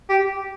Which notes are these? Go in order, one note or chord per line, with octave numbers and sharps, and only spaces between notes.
G4